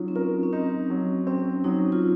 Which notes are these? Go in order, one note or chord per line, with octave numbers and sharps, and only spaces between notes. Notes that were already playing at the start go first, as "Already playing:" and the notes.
Already playing: F#3 C#4 D#4 F4
C4
C#4 A#4
C#4
C4 D#4
F#3
C4 C#4
F#3 D#4
F4